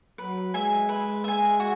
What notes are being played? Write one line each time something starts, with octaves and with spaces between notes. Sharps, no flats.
F#3 B4
G#3 E5 G#5
B4
E5 G#5
F#4